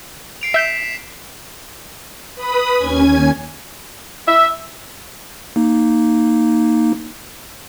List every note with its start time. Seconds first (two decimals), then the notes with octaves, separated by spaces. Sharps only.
0.41 C7 D7 F7
0.54 E5 G6 B6 E7
2.36 B4 B5 D#6
2.77 D#2 C#4 G#5 G#6
4.27 E5
5.56 A#3 D#4